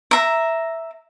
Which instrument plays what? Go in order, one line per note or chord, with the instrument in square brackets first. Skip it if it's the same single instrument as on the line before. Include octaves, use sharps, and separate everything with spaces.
[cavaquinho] E5 A#5